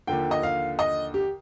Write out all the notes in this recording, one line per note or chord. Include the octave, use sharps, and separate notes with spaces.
D#2 D3 F3 G5
D#5
F5
D#5
G4